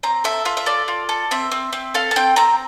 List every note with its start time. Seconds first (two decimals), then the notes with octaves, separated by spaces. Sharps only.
0.03 C4 A#5
0.24 A4 E5
0.45 F4 E5
0.57 E5
0.66 A4 D5
0.88 F4
1.09 A4
1.31 C4 E5
1.52 C4
1.73 C4
1.94 A4 F5
2.11 A5
2.16 C4 G5
2.36 C4 A#5